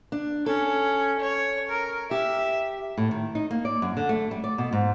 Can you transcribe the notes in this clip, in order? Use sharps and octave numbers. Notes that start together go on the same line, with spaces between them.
D4
C#4 A4
C#5
A#4
G4 E5
A2
D#3
D#4
A#3
D5
F#2
D3
A3
G3
D5
B2
G#2